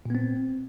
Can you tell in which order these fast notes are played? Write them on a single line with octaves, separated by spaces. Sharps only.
A#2 B3 C4